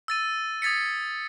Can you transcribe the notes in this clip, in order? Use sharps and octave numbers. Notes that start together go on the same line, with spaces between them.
E6 A6 D#7
D#6 G#6 A6 B6 C#7